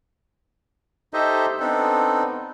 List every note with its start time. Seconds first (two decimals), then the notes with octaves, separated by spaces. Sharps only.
1.14 D#4 G4 A4 C5 D#5 E5
1.60 B3 C4 D4 D#4 A4